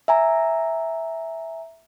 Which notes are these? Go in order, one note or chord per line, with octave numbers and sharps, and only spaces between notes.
E5 G#5 A#5